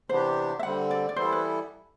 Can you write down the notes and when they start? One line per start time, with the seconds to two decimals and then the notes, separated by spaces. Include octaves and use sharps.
0.09 C3 E3 B3 D4 G4 C5
0.59 E5
0.63 D3 G3 C4 F#5
0.91 D5
1.09 D5
1.16 E3 G3 B3 E4 A4 C5
1.32 B4